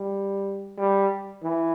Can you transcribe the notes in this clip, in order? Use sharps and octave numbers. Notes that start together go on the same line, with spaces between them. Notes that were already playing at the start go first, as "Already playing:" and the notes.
Already playing: G3
G3
E3